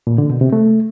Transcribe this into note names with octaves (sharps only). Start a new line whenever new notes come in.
A#2
D3
B2
C3
A3